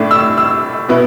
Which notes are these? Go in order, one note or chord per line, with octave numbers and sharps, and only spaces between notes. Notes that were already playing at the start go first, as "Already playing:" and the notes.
Already playing: A2 A3 D4
E6
E6
B2 B3 E4